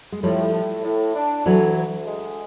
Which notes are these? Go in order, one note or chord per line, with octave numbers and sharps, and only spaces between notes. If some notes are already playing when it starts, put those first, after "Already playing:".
G#3
A2 F3 G3
A2
A2
D4
D2 E3 F#3
D2
G#3